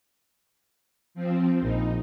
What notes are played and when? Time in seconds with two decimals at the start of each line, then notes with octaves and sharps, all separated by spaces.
1.14 F3 C4
1.61 A#1 D#4